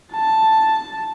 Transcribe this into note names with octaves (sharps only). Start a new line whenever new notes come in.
A5